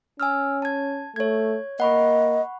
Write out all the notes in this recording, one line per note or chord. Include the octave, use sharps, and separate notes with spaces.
C#4 G#5 E6 F6
A5 G#6
A3 C#5 G#6
A#3 D#5 F#5 B5 C#6